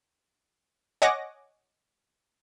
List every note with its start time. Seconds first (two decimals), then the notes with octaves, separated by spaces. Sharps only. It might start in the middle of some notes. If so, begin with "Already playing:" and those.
1.02 C#5 D#5 F#5 G#5 D6 A#6